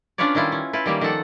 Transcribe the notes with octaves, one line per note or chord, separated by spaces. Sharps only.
C#4 D4 F4 B4 C#5 D5
D#3 G3 E4 F4
C#4
E4 F4 B4
D#3 G3 A#3
D#3 F3 A4 F#5